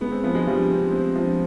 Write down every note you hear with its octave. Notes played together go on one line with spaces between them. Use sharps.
G#3 B3
C4
F3 B3
G#3
F3 G3
C4
C4
F3